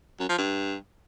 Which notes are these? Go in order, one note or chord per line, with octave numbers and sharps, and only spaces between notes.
F#2
F3
G2